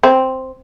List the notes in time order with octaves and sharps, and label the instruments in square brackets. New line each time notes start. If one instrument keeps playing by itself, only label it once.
[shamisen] C4